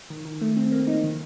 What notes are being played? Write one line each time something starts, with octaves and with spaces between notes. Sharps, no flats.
D#3
D#3
A3
C4
A#3
D#4
D#3